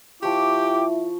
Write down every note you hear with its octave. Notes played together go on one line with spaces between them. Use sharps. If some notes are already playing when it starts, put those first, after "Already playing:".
F3 E4 G4 G5 C#6 D6